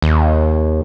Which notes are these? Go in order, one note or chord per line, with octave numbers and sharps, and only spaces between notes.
D#2